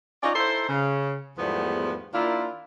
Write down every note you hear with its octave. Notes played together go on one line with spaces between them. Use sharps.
C#4 D#4 F4 C#5 D5
D#4 E4 A4 C5
C#3
E2 G#2 F3 G3 A3 B3
D#3 A#3 D4 E4 F4